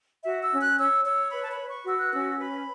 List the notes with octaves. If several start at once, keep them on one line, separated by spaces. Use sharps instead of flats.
F#4 E5
E6
C#4
F#6
C#5 E6
C#5 E6
B4 B5
A5
B5
B4
C#6
F#4 E6
F#6
C#4 E6
B4 B5